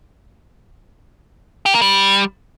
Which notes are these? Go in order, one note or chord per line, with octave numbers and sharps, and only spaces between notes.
G4
A#3
G3